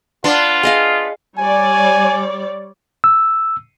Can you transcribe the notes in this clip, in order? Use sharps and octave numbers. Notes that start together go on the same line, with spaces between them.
B3 D4 F4 C6
G#4 D#5 F5
G3 C#5 D5 G#5
E6